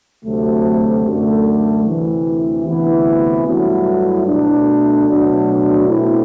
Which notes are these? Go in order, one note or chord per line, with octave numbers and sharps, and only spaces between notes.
D2 C3 F#3 A3
F#2 D3 A3
D2 C3 E3
D2 C3 E3 B3 E4
G2 F#3 A3 E4
B2 A3 D4
B2 F#3 A3 D4
B2 A3 C4 E4